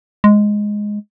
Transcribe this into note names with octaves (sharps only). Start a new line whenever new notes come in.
G#3